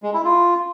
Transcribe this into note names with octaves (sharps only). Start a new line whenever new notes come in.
G#3
E4
F4